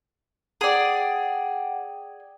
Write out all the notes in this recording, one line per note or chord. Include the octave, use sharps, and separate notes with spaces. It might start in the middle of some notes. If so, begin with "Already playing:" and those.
G#4 D5 F#5 G5